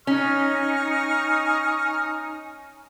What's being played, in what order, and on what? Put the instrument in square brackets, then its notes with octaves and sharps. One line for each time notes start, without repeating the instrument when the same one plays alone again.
[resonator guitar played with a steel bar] C#4 [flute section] D#4 G#5 A#5 [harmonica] C#6 D#6 F6